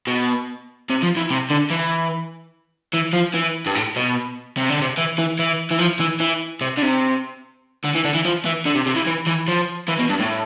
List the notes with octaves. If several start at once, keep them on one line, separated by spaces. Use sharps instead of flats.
B2
C3
F3
E3
C3
D3
E3
E3
F3
E3
G2
A2
B2
C3
D3
C3
E3
E3
E3
E3
F3
E3
E3
C3
D3
C3
D3
E3
D3
E3
F3
E3
D3
C3
C3
E3
E3
E3
F3
E3
B2
G2
A2